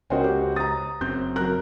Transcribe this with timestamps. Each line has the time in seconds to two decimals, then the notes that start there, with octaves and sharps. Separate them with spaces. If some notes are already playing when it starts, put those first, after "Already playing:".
0.10 C#2 C#4 F#4 A#4 C5 D#5 G5
0.24 G4
0.56 A#5 D#6 A6
1.01 F#1 F#2 C4 G6
1.36 F#3 A#4 F#6